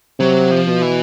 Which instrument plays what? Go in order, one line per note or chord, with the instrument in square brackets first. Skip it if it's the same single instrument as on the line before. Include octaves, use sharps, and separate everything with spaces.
[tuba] C3 [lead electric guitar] F#3
[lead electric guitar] F3
[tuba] B2
[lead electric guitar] E3